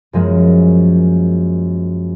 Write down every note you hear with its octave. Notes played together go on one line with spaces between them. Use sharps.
F#2 F3 G#3 A#3